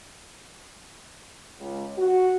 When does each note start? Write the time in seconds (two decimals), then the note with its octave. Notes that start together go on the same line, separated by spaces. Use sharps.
1.60 C#2
1.98 F#4